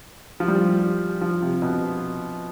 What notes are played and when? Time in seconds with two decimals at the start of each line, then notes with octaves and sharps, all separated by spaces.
0.40 F3
0.48 G3
0.56 F3
1.21 F3
1.42 C3
1.62 B2